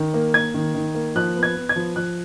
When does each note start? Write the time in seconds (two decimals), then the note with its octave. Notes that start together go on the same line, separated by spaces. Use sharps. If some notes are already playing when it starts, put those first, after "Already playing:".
Already playing: D#3
0.14 A#3
0.34 A#3 G#6
0.54 D#3
0.75 D#3
0.95 A#3
1.16 F3 F#6
1.36 B3
1.43 G#6
1.56 B3
1.69 G#6
1.76 F3
1.96 F3 F#6